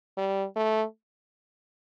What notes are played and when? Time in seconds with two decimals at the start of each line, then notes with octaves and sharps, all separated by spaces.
0.17 G3
0.56 A3